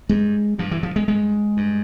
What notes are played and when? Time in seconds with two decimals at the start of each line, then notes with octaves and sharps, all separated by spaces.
0.09 G2 G#3
0.59 G2 F3
0.71 E3
0.83 F3
0.96 G#3
1.08 G2 G#3
1.57 G2